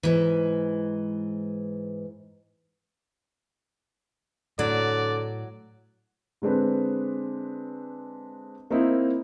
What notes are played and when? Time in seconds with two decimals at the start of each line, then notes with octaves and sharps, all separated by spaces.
0.03 G#2 E3
4.59 A2 D3 F#3 D5
6.42 D3 G#3 C4 D4 B4
8.71 A#3 C4 D#4 E4